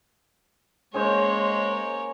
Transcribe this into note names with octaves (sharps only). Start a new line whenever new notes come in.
G#3 A#3 C#4 G#4 C5 C#5